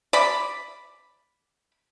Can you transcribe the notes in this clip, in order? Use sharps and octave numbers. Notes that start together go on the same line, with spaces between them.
D5 B5